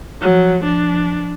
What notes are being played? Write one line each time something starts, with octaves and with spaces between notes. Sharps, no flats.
F3 F#3
F3 D4